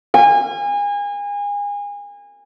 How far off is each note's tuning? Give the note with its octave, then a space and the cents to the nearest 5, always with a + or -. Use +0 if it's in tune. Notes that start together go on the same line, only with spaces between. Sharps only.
G#5 -30